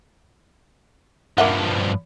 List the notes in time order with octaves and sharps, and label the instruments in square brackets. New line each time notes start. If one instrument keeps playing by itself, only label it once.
[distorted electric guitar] G2 F3 [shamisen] A#3 E5 F#5